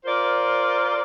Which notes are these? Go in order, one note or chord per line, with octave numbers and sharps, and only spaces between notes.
F4 A#4 C5 D5